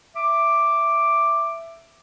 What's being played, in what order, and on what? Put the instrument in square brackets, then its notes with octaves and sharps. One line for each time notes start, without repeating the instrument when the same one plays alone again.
[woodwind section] E5 D6